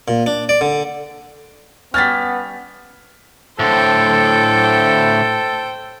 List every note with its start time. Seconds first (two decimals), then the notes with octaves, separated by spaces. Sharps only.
0.08 A#2
0.26 D4
0.49 D5
0.61 D3
1.94 G3 B3 C#4 F6 A6 B6
3.59 A2 D3 A4 C5 G5